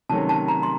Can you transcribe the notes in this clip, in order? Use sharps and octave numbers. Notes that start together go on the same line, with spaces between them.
C3 D#3 F#3 A3 C#4 A5
A5
A#5
C6